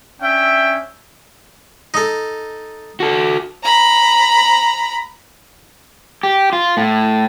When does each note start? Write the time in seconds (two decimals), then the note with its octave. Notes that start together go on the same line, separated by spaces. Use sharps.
0.20 C#4 D4 E5 G5
1.94 D#4 A4
3.00 F#4 A4
3.64 A#5 B5
6.23 G4
6.53 F4
6.77 A2